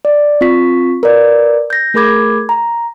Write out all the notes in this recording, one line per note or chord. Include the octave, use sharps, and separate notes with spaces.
D5
C4 F4 C#6 B6
A#4 B4 D5
G6 A#6
A3 G#4 A#4 B5 D6 G#6
A#5